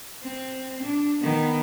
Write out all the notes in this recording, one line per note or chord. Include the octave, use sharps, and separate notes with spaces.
C4
D4
D#3 B3